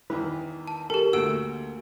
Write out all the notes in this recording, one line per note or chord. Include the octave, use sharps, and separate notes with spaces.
E2 D#3 E3 B4
A5
G4 A4 A#4
D2 A3 A#3 F#4 E6 D7